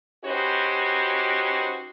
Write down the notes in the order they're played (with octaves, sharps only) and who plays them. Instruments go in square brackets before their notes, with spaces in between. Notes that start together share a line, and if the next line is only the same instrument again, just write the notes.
[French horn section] C#4 D#4 F#4 G4 B4 C5